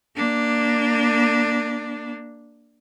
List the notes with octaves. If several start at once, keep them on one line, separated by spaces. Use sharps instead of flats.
A#3 D4